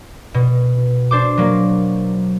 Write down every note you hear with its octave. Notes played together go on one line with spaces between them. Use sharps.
B2
D4 C5 D6
F#3 A#3